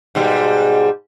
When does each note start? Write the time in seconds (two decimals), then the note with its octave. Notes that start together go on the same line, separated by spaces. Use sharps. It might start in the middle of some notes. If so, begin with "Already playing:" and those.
0.15 G#2 B2 G3